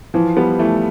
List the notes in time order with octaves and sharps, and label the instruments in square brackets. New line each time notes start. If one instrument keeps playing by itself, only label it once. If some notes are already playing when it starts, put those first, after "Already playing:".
[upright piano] E3 [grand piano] F3
[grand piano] G3 [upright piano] B3
[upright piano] E3 [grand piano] A3